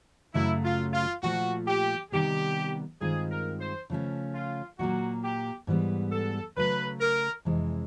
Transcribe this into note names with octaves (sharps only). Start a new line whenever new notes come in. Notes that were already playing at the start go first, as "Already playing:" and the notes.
F#2 C#3 F#3 A3 E4
F4
F4
A#2 F3 A3 F#4
G4
C3 D#3 G3 B3 G4
G2 D#3 G#3 C4 F4 G#4
A#4
C5
C#3 F3 A3 C#4
F4
A#2 F#3 A#3 F#4
G4
G#2 E3 G3 B3
A4
C#3 F#3 A3 B4
A#4
F2 C3 E3 G#3